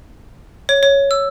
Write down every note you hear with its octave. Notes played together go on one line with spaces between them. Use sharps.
C#5
C#5
E6